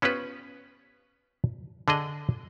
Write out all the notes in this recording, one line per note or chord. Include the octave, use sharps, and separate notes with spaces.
B3 C#4 F4 G4 B4 C5
D3 D4 G#4 D#5